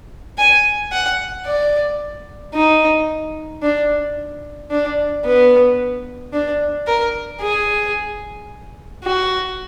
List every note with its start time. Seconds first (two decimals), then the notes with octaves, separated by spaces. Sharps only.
0.38 G#5
0.92 F#5
1.46 D5
2.54 D#4
3.63 D4
4.71 D4
5.25 B3
6.33 D4
6.87 A#4
7.42 G#4
9.04 F#4